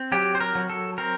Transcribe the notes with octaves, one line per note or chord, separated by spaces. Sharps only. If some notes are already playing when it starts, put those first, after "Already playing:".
Already playing: C4
F#3 G4
C5
A#4
F#3
A4
C4 A#4